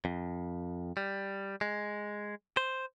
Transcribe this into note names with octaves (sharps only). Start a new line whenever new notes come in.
F2
G3
G#3
C5